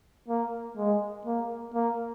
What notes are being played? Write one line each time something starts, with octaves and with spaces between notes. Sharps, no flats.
A#3
G#3
A#3
A#3